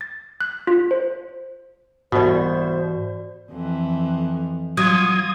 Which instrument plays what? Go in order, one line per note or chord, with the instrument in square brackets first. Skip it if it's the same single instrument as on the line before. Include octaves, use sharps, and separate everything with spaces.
[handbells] A6
F#6
F4
C5
[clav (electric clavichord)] C2 B2 [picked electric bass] G#2 E3 [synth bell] F#4 D5 [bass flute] C5
[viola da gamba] F2 E3
[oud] F#3 [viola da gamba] F4 [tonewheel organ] D#6 G#6